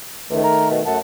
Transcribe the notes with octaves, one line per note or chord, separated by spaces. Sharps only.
C#2 D#3 A3
A#4
B2
F#2 A3 F#5 A5